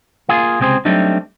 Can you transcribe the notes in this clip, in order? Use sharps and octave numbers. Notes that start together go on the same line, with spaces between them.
A#3 F4 G#4
C#2 C3 C4 G#4 C5
F#3 G3 A3 C4 D4 D#4